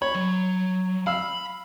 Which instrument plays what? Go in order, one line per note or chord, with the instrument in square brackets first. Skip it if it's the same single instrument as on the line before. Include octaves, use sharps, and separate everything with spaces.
[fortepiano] C#5 [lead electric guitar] B5
[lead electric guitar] F#3
[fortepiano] F5 E6 [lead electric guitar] B5